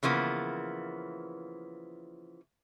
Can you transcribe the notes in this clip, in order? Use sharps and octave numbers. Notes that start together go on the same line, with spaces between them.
C#3 E3 F3 A#3 B3